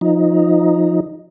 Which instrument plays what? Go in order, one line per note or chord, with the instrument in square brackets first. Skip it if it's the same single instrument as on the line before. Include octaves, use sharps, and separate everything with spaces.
[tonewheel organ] F3 D#4